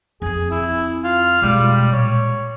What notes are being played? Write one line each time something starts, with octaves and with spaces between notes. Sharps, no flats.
F2 C4 G#4
E4
F4
B2 G3 G#3
A#2 C#5